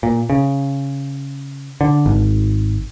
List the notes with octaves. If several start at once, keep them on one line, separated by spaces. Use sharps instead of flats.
A#2
C#3
D3
G#1